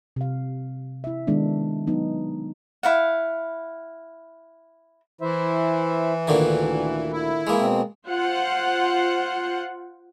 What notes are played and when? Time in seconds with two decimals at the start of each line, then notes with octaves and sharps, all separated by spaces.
0.16 C3 F5
1.04 E4 E5
1.27 D#3 G#3 B3 D4
1.87 F#3 B3 D#4
2.83 E4 F5 F#5
5.21 E3 E4 C5 E5
6.28 D2 A#2 D3 D#3
7.12 E4
7.47 E3 G#3 A#3
7.58 B2 C4
8.09 F4 C5 F#5